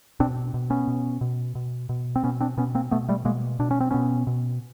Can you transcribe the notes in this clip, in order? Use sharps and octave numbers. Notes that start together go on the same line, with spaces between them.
B2 C4 D4
B2
B3 C#4
B2
B2
B2
B2
C4
B2 B3 C#4
C4 D4
B2 B3 C#4
A#3 C4
B2 A3 B3
G3 A3
B2 G#3 A#3
B2 D4
C#4
C4
B2 B3 C#4
B2